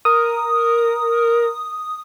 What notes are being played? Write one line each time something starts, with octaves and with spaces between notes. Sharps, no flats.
A#4 D#6